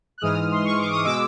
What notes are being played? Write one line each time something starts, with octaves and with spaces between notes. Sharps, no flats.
F#6
G#2 E3 G#3 D#6 F6
C6
C#6
D6
D#6
B2 G#3 D6 E6